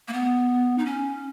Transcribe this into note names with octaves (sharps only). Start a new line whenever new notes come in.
A#3
B3
D#4
C#4